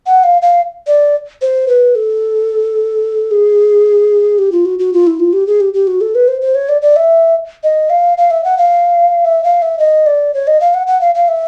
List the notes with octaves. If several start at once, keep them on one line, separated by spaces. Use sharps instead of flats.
F#5
F5
F5
D5
C5
B4
A4
G#4
G4
F4
F#4
F#4
F4
E4
F4
G4
G#4
G4
G4
F#4
A4
B4
C5
C5
C#5
D5
D5
E5
D#5
F5
F5
E5
F#5
F5
E5
F5
E5
D#5
D5
C#5
D#5
F5
F#5
F#5
F5
F5
E5